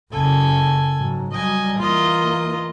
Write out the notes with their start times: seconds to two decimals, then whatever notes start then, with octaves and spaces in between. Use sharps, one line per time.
0.12 F#1 C#3 A4 G#5
0.97 G#2 F#3
1.31 F#3 G3 D#5 G#5
1.78 E3 A#3 F4 D#5